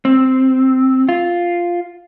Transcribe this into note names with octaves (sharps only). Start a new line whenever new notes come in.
C4
F4